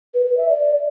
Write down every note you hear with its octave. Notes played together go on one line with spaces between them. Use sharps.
B4
B4
E5
D5